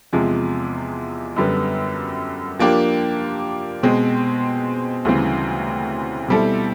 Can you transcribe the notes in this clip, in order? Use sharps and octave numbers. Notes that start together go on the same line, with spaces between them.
E2 C3 F3 G#3
F#2 D3 G3 B3
F3 A#3 D4 G4
B2 G#3 C4
D2 C#3 E3 G3 C4
B2 G3 C4 E4 A4